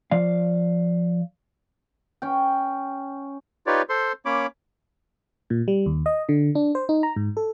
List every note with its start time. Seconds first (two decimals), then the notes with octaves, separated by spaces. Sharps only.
0.11 F3 D5 F5
2.22 C#4 G5
3.67 D#4 F4 G4 B4 C#5 D5
3.89 A4 C5 C6
4.26 A#3 C#4 C#5 B5 D6
5.50 A#2
5.68 G3
5.86 D#2
6.06 D#5
6.29 D3
6.55 D4
6.75 C5
6.89 D#4
7.03 A#5
7.16 G#2
7.37 A4